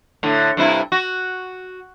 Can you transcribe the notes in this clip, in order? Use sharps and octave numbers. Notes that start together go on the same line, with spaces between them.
A2 D3
G2 C3 E4
F#4